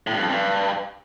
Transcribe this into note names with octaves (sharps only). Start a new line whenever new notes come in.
A2
G2
F2
G2